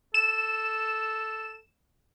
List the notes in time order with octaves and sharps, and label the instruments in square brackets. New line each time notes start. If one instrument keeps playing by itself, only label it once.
[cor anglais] A4 [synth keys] E7